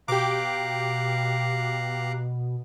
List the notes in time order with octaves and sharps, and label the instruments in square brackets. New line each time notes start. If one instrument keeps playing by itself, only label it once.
[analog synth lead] B2 [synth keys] G4 D6 [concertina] F5 A#5 F#6